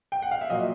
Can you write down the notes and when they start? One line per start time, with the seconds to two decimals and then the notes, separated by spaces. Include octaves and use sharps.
0.12 G5
0.22 F#5
0.31 F5
0.41 E5
0.50 A#2 F#3 D#5